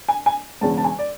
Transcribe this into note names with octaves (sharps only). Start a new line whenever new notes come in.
G#5
G#5
E1 E2 C#3 A5
A5
G#5
D5